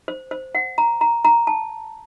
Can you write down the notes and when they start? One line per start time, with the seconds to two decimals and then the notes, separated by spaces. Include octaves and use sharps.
0.08 C5
0.31 C5
0.55 F#5
0.78 A#5
1.01 A#5
1.25 A#5
1.47 A5